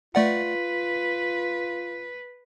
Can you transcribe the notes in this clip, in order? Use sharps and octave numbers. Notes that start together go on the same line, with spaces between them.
A3 F4 B4 D5 F#5